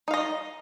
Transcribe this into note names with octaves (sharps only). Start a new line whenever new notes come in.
D#4 D#5 F5